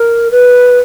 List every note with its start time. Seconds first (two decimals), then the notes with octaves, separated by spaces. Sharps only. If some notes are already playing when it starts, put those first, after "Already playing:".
Already playing: A#4
0.31 B4